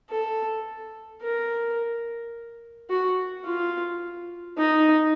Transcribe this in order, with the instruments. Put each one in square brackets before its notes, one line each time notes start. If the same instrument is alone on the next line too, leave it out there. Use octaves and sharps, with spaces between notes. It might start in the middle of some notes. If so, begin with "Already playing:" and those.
[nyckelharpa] A4
A#4
F#4
F4
D#4